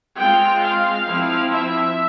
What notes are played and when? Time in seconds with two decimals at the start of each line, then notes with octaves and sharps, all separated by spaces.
0.18 G#3 C4 F4 G5
0.63 F5
1.08 F3 C4 E4
1.52 E5